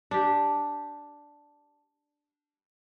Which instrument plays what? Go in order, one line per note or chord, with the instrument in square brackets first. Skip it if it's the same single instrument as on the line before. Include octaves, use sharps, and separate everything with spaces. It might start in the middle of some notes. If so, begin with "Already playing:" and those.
[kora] D4 G4